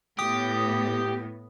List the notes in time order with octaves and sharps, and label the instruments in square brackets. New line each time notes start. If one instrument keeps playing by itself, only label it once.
[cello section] A2 B3 [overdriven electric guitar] G4 [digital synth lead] D#6